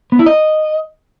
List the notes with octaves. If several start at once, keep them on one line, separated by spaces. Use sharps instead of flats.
B3
E4
D#5